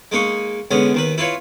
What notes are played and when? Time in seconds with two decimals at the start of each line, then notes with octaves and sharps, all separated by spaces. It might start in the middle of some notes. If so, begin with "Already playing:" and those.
0.12 G#3 A#3 D#4 C#6
0.71 D3 G#3 B3 C#4
0.94 D#2 D#3 B4
1.18 E4 F4 B4 C#5